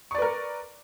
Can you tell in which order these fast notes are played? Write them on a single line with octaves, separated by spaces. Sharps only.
C#6 D5 B4 A#4